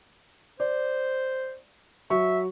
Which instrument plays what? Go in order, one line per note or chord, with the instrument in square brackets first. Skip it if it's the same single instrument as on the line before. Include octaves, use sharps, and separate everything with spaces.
[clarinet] C5 [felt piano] D5
[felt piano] F#3 C#6 [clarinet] E5